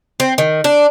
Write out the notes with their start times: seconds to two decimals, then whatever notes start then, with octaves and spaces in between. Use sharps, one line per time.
0.20 C4
0.38 D#3
0.64 D4